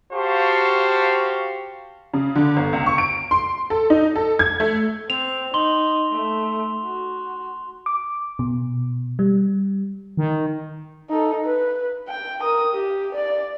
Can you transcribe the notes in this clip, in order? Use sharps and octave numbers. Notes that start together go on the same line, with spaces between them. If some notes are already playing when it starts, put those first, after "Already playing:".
F#4 G4 C5 F5 A5 C#6
C#3
D3
G1
C#2
C#6
D7
C6
A4
D#4
A4
G#6
A3
C4 F7
D#4 C6 G7
A3
F#4
D6
B2
G3
D#3
D#4 A4
B4
G5
A#4 D#6
G4
D5